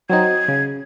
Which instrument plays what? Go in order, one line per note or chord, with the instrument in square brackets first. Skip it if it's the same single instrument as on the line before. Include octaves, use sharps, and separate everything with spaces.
[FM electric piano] F#3 C4 D#4 [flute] G#6
[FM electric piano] C#3